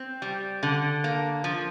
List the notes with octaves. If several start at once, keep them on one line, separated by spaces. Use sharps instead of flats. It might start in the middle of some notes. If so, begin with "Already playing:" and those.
Already playing: C4
G3
D3
A#3
F3